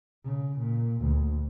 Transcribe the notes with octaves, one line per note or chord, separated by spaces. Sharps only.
C#3
A#2
D2